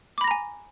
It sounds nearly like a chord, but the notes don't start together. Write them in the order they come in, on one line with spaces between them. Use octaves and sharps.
D6 B5 A#6 A#5 G#5